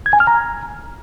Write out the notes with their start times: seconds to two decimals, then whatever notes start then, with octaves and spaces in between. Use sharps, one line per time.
0.06 G#6
0.13 G#5
0.20 F6
0.27 A#5